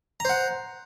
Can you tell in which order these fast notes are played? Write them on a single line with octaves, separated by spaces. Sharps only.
A#5 C5 F#5